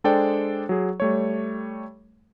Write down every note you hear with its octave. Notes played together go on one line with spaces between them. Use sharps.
G#3 D4 A4 C5 D5 G5
F#3 G#4
G3 A3 C#5